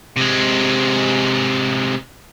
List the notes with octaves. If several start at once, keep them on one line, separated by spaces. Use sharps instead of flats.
C3 G#3